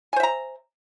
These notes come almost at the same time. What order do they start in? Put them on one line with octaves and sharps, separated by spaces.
G#5 C5 E5 A#5